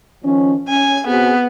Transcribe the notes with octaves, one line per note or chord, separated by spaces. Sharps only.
D#3 F3 C#4
C#4 G#5
B3 C4 F#4 G#4